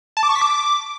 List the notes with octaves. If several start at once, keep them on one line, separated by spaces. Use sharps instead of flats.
A5
D6
C#6
B6
D6